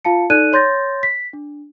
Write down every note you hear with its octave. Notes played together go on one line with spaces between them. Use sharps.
F4 F5 A5 C#7
D#4 A4 D5 F#6 D#7
C#5 C6 G6 A6 A#6
B6
D4